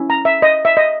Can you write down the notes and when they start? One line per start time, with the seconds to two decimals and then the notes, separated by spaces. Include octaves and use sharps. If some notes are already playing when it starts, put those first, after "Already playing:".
Already playing: C#4 E4
0.10 A#5
0.25 E5
0.42 D#5
0.65 E5
0.77 D#5